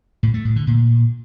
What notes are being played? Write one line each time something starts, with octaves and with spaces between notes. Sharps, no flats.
A2
A3
A2
D3
A#2